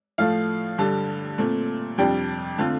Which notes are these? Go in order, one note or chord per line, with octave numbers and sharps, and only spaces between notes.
A2 F3 A3 F5
G2 D3 G3 A5
A#2 A3 C4
F2 C3 G3 D4 G5
D3 A3 C4 F4